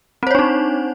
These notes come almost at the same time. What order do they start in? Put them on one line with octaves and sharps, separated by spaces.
C4 C5 C#5 D4 D#4